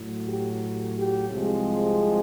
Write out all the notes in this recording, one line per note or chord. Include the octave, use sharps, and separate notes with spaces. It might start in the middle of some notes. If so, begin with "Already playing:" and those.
Already playing: A2 F#3
G4
G4
C2 C3 F3 G#3